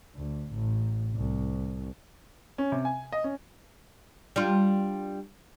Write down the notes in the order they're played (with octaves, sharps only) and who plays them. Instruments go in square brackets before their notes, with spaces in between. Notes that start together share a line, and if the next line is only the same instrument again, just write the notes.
[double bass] D2
A1
C2
[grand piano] C#4
C3
G#5
D#5
C#4
[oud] G3 D4 F4